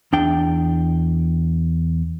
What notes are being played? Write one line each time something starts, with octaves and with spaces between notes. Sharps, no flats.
E2 D4 G5